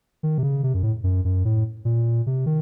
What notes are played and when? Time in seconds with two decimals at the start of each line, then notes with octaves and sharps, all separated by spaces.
0.23 D#3
0.38 C3
0.43 C#3
0.63 C3
0.74 F#2
0.83 A2
1.04 F#2
1.25 F#2
1.45 A2
1.85 A#2
2.27 C3
2.46 D#3